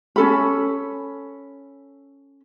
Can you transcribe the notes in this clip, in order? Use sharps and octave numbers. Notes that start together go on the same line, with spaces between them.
C#4 A4 B5